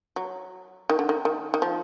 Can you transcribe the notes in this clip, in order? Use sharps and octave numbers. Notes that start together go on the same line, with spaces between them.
F#3
D#3
D3
D#3
D#3
D#3
F3